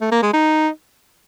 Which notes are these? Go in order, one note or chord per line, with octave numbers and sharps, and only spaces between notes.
A3
A#3
G#3
D#4